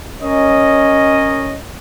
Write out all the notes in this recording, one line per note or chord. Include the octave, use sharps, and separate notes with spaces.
C#4 A#4 C#5 D#5